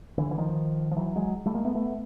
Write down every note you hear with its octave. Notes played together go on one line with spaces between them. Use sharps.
D3 E3
E3
D#3 F3
F3
E3 F#3
F#3 G#3
G3 A3
G#3 A#3
A3 B3
A3 B3